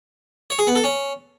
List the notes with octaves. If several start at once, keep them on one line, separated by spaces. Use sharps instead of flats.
C#5
G#4
B3
A4
C#4